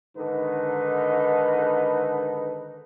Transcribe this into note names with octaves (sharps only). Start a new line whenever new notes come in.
G#2 D3 D#3 D#4 A4 B4